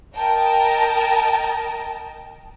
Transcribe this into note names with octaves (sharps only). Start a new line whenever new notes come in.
A#4 D#5 G5 A5